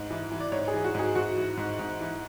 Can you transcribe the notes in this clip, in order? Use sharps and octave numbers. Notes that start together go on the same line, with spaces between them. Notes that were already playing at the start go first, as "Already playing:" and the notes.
Already playing: G#2
E3
E3
D5
G#2 C#5
G#4
E3
F#4
G#2 G#4
G#2 F#4
E3
G#2
G#2
E3